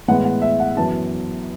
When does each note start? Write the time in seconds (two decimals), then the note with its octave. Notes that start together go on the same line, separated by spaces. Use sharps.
0.08 A2 E3 G#3 B3 F#5
0.25 F#5
0.42 E5
0.60 F#5
0.76 F#2 E3 B3 A5